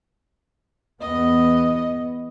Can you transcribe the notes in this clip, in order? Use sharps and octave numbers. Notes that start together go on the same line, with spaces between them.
E2 B3 D#5